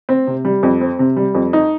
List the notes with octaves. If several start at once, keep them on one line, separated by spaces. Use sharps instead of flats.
C4
C3
G3
F2
C4
C3
G3
F2
D#4